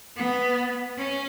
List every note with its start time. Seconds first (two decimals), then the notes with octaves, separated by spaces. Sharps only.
0.17 B3
0.99 C#4